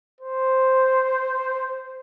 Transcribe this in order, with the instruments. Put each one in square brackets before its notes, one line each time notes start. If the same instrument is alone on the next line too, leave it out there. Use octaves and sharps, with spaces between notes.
[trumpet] C5